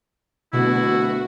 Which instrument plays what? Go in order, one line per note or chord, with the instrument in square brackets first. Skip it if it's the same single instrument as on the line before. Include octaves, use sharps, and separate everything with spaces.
[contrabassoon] D1 [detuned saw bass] B2 [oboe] E4 [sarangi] F#4